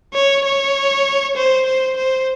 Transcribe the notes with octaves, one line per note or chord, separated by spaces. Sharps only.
C#5
C#5
C5
C5
C5